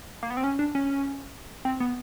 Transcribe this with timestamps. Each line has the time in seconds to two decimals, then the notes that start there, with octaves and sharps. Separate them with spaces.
0.23 A#3
0.30 B3
0.37 C4
0.44 C#4
0.59 D4
0.75 C#4
1.65 C4
1.80 B3